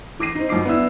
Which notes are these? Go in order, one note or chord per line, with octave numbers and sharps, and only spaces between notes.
E3 D6 A#6 C7 D#7
C4 D#4
F#2 F3 D#4 D6 C7
B3 D4 E4 E6